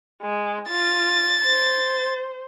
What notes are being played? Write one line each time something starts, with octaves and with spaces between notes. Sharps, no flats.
G#3
F4 A6
C5